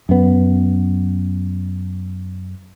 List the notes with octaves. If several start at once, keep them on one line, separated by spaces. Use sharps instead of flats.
F#2 B3